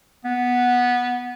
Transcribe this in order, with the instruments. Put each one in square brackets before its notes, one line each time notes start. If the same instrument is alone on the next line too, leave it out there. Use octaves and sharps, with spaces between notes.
[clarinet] B3